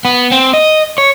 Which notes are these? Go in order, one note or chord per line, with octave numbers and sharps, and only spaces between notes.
B3
C4
D#5
C#5